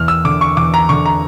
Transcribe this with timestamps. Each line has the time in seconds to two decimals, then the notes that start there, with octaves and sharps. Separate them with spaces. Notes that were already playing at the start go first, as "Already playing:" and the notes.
Already playing: E2 F6
0.08 E6
0.25 D3 D6
0.41 C#6
0.57 E2 D6
0.74 A#5
0.89 D3 C#6
1.06 A#5